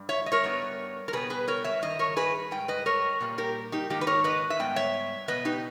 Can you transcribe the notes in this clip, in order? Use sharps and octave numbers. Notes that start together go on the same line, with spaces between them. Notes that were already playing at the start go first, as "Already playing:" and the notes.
Already playing: G2 G3
C#5 E5
D#5
A#4 C#5
G2 G3 B3
A#4
B2 G3 B3 G#4 B4
G#4 B4
A#4 C#5
C#5 E5
G2 D#3 D#5
A#4 C#5
G#4 B4
G#2 G3 G5
B4 D#5
A#4 C#5
A#2 G3 A#3
G4 A#4
D#4 G4
G#2 D#3 A#3 D#4 G4
B4
A#4 C#5
B4 D#5
E5
G#2 G3 B3 G5
C#5 E5
B2 G3 B3 B4 D#5
D#4 G4